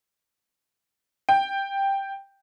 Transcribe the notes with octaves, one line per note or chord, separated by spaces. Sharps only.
G5